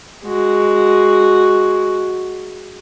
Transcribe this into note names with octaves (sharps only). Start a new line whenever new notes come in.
G#3 F#4